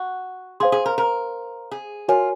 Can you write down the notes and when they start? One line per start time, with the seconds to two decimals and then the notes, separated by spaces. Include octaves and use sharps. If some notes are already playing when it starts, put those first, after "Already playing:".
Already playing: F#4
0.60 G#4 C5 F5 C6
0.72 G#4
0.86 A#4
0.98 A#4
1.71 G#4
2.08 F4 F#4 A#4 C#5 G#5